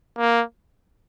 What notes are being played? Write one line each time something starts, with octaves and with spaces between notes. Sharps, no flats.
A#3